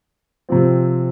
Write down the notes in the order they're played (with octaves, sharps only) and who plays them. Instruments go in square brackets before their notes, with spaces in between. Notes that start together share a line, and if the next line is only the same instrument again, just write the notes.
[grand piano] C3 F3 C4